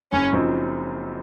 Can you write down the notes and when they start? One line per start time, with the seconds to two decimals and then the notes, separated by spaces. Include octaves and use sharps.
0.12 F#1 C#4
0.33 F#2 F3 C4 D#4